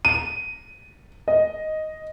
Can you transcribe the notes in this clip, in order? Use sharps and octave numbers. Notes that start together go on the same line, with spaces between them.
D#7
D#5